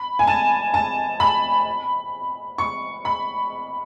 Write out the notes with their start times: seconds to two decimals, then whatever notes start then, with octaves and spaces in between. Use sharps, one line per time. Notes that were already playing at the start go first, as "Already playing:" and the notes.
Already playing: B5
0.19 G#5
0.27 A5
0.74 A5
1.20 B5
2.58 C#6
3.05 B5